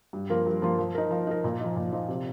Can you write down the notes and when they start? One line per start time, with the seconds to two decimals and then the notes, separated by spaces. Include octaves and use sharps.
0.13 G2
0.30 F3 A#3 F4 A#4
0.46 G2
0.62 F3 A#3 F4 A#4
0.79 F3
0.95 D#4 A#4
1.11 F3
1.27 D#4 A#4
1.44 A#2
1.61 F3 D#4
1.76 A#2
1.92 F3 D#4
2.08 C3